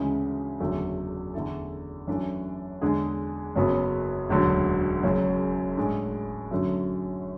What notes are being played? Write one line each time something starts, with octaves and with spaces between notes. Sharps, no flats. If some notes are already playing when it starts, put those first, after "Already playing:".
Already playing: D2 C#3 E3 G#3 C#4
F#1 E2 D3 F#3 A3
E2 D3 A3 E4 A4
F#2 E3 A3 D4
E2 D3 G#3 D4 G#4
F#1 F#2 C#3 F#3 B3
E1 D2 D3 F#3
F#1 F#2 C#3 F#3
A2 G#3 D4
F#2 D3 F#3 A3